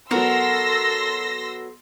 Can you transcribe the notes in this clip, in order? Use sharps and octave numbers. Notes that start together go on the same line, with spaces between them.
F#3 B3 F#4 A4 A#4 C6 E6 A#6